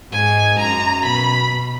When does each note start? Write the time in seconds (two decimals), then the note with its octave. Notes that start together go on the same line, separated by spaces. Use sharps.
0.12 G#2 G#5
0.59 F#2 A#5
1.05 B2 B5